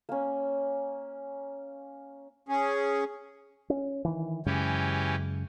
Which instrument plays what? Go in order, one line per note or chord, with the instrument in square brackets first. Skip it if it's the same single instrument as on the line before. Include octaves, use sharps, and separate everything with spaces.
[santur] A#3 C#4
[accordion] C#4 G#4
[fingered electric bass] C#4
D#3 E3
[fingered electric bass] F#2 C#3 G#3 [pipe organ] E3 C#4 G4